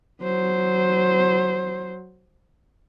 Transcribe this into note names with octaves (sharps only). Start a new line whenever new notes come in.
F#3 C5